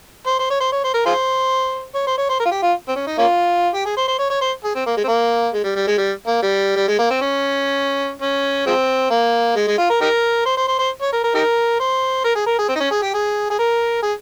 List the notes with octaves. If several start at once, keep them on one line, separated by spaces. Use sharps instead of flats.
C5
C5
C#5
C5
C#5
C5
A#4
F4 G#4 C5
C#5
C5
C#5
C5
A#4
F4
G4
F4
C4
C#4
D#4
A#3 C#4 F4
G4
G#4
C5
C5
C#5
C#5
C5
G#4
C4
A#3
G#3
C4
A#3
G#3
G3
G3
G#3
G3
A#3
G3
G3
G#3
A#3
C4
C#4
C#4
F3 G#3 C4
A#3
G#3
G#3
F4
A#4
D#4 G4 A#4
C5
C5
C5
C5
C#5
A#4
A#4
D#4 G4 A#4
C5
A#4
G#4
A#4
G#4
C4
D#4
C#4
G#4
G4
G#4
G#4
A#4
G#4